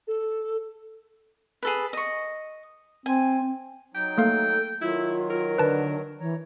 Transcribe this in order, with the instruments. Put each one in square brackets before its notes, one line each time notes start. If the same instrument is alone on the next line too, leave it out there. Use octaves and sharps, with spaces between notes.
[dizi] A4
[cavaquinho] G#4 A4 B4
D#5 C#6
[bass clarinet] C4 [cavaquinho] G#5
[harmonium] F#3 D#4 [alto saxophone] G5
[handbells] A3 A#3 F5 [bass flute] A4
[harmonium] D#3 F#3 [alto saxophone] E4 [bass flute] F4
[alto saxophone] A#4
[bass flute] D3 [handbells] B4 A5
[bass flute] E3 [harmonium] C#5 A#5